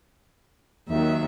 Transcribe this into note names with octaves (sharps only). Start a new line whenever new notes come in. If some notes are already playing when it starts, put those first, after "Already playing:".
D#2 D#3 F#3 E5